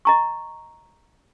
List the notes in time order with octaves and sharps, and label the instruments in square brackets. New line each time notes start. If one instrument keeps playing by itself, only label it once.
[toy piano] D#5 A#5 C#6